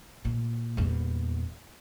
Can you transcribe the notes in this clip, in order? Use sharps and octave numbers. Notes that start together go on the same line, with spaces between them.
A#2
D#1 E2